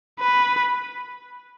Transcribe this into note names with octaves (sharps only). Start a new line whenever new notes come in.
B4